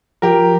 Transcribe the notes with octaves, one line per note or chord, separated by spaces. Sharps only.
F3 G4 A#4